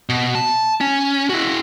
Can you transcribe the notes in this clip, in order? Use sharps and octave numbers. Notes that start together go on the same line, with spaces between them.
B2
A5
C#4
E4 F#4